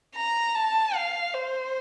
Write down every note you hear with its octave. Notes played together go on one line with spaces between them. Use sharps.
A#5
A5
F5
C5